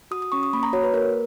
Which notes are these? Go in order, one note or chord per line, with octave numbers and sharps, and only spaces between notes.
F#4 D#6
D#6
C#4 C#6
D#6
A#3 B5
A#5
F#4 C#5
B4
A#3 A#4